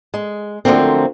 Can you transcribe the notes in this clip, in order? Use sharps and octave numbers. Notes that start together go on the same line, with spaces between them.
G#3
D3 F3 F#3 A3 A#3 C4